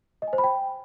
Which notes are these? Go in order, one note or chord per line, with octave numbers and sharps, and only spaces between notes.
D#5
G#5
C5
B5
G5